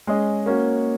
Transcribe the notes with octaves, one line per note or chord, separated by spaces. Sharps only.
G#3 C#4 G#4 D#5
A#3 C#4 F#4